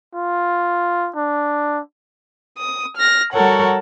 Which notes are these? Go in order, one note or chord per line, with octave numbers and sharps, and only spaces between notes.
F4
D4
D#6
F6 A#6
G3 F#4 A4 A#4 C#5 F#5